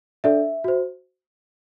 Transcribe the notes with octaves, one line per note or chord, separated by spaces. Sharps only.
D4 A4 D5 E5
F#4 C5